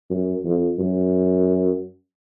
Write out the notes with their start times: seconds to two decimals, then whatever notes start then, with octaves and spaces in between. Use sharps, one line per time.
0.10 F#2
0.45 F2
0.79 F#2